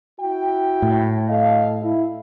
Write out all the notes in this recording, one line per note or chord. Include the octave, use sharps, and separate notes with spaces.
E4 F#4 G5
A2
A4 D#5 F5
E4